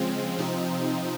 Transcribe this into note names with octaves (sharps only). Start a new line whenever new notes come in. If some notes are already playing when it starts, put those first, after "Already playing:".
Already playing: C#3 F3 G#3 C4
C3 F3 C4 D#4